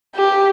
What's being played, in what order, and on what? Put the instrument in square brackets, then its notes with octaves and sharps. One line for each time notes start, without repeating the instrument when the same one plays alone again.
[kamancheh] G4